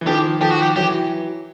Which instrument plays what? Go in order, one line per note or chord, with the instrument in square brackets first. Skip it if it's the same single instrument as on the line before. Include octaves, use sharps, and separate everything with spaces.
[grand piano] E3
[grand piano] D#3 F3 [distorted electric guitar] G4
[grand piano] D#3 F3 [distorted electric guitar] G4
[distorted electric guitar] F#4
G4
[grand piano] E3 F#3 [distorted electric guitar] G4